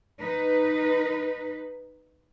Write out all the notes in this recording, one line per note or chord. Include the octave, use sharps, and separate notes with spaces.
D#4 B4